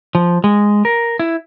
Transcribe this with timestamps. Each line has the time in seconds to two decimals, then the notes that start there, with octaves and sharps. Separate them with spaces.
0.15 F3
0.44 G#3
0.85 A#4
1.19 E4